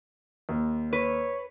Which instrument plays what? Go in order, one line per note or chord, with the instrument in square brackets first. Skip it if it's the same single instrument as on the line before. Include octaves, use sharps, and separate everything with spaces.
[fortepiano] D#2
[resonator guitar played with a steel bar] B4 [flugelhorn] C#5